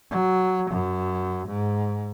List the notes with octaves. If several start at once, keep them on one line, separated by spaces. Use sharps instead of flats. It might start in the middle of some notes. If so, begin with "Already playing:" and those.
F#3
F#2
G#2